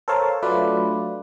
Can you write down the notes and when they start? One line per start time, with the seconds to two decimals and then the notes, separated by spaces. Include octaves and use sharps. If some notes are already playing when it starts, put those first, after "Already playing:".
0.08 A4 A#4 C5 C#5 F5 A5
0.42 F#3 A3 D4 F4 B4 D5